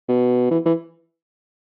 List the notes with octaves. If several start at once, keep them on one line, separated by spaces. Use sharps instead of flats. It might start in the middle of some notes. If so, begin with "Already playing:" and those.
B2
E3
E3